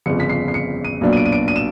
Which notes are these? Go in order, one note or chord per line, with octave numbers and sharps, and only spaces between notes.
G1 F2 C#3 C#7
B6
C7
C7
C#7
D#7
B1 A#2 F#3 B3 D4
D#7
D7
D#7
D7
D#7
E7